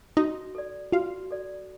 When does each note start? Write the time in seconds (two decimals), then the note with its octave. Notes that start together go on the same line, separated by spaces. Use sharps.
0.17 D#4 F#4 D#5
0.55 A4 D5
0.92 F4 F#4 F5
1.31 A4 D5